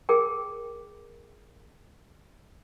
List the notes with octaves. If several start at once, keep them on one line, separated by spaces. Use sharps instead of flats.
G#4 A#4 G5